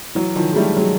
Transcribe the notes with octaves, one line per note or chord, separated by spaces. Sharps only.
E3 F#3
D#3 F3
G#3
G3 A3
F#3 G#3